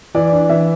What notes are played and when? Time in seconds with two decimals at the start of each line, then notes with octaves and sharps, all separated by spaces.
0.15 E3 D5
0.32 D4
0.49 E3 E5